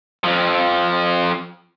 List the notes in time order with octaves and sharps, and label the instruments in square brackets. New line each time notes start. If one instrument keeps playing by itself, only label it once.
[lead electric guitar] F2 F3